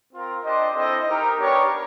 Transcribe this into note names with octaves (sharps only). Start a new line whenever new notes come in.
C4 F4 A#4
D4 G4 C5 D#5
C4 E4 A4 C5 D#5
D#4 G4 A#4
B3 D4 G4 A#4 C#5